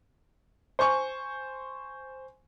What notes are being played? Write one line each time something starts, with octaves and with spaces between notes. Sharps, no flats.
C5 G#5 C#6